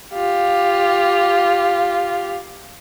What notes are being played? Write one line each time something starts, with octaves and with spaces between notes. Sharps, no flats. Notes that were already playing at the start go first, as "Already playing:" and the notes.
F4 G4